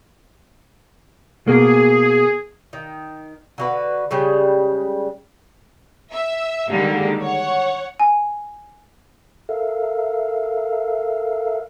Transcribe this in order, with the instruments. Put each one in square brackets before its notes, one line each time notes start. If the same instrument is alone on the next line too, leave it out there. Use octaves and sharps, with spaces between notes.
[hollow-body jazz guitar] B2 A#3 [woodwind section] G#4
[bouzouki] D#3
D3 F#4 B4
C#3 G3 G#3
[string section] E5
D3 D#3 G3 G#3 A#3
C#5 F#5
[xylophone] G#5
[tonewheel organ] A4 A#4 E5 F5